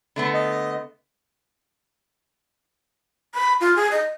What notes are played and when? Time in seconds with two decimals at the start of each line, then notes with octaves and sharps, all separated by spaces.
0.16 D3 A3 B3
0.34 D#5
3.34 B5
3.61 F4
3.76 G#4
3.91 D#5